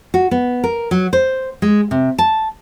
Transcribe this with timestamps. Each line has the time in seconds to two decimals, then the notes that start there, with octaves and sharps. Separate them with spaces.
0.14 F#4
0.31 B3
0.64 A#4
0.91 F#3
1.13 C5
1.62 G#3
1.91 C3
2.18 A5